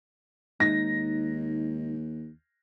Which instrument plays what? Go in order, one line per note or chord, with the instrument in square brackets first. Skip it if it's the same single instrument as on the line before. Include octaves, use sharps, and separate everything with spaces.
[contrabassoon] D#2 [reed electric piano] G#3 D#4 [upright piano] A#6